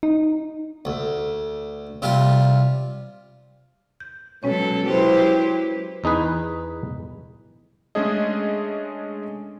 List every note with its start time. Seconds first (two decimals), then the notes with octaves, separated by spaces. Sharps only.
0.03 D#4
0.85 D2
2.02 C3 G3 F4
4.00 G6
4.43 B2 F#3 G#3 C#4 A4 C#5
4.86 F#3 E4 G4 B4 C5
6.04 E2 D#4 G#4 B4
7.95 G#3 A3 C#4 D4 G#4 D#5